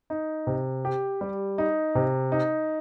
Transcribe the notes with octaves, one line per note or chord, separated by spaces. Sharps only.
D#4
C3
G4
G3
D#4
C3
D#4